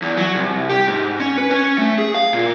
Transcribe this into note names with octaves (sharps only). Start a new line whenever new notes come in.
E2
F#3
C2
G4
G#2
C#4
B4
C#4
A3
G#4
F5
A#2